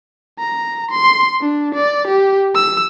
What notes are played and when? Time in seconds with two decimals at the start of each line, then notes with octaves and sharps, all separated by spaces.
0.39 A#5
0.91 C6
1.41 D4
1.74 D5
2.07 G4
2.55 E6